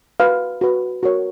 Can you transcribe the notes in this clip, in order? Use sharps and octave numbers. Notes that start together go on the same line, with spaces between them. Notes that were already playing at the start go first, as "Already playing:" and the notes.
F#4 B4 F5
F#4 B4
F#4 A#4 C#5